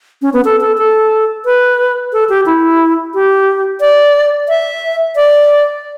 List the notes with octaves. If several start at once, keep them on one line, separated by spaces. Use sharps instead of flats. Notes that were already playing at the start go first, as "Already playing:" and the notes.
C#4
B3
A4
A4
A4
B4
A4
G4
E4
G4
D5
E5
D5